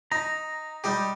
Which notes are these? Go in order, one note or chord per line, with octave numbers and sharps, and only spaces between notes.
D#4 A#5
G3 D#4 G4